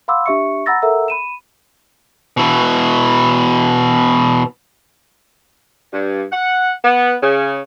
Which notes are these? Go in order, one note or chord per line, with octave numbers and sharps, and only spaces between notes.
F5 F#5 B5 C6 D6 E6
D4 G4 E5 C#6 C#7
F#5 A#5 B5 E6 A6 A#6
A4 A#4 E5 F#5 A#5 E6
B5 D#7 E7
B2 E3
G2
F#5
B3
C#3